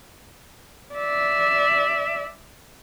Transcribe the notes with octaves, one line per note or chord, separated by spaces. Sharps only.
D5 E5